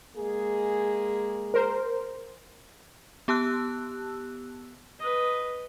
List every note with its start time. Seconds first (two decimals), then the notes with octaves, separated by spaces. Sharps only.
0.16 G#3 A#3 G#4
1.54 A#4 C5
3.28 B3 G4 A5 E6 F#6
4.99 B4 D#5